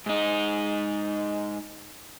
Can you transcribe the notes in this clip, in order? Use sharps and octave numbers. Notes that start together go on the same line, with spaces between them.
G#2 D#4